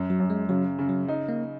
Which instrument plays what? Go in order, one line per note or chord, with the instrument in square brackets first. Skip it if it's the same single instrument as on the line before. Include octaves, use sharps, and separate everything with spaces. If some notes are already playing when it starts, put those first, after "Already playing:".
Already playing: [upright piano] F#2
[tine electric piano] F#3
[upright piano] F#2
[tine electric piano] G#3
[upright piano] C#3 [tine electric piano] F#3
[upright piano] C#3
[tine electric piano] F#3
[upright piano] D#4
[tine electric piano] A#3